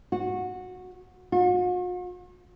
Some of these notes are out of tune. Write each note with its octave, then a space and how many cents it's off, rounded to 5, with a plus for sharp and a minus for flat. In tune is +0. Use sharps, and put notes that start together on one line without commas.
F#4 -15
F#4 -45